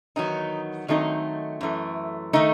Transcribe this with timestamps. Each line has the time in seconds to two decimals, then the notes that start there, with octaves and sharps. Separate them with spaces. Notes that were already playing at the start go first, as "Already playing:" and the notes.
0.16 E2 D#3 F#3 B3 D#4
0.88 D#3 F#3 A3 C4 D#4
1.61 F#2 E3 A3
2.33 D#3 A3 D#4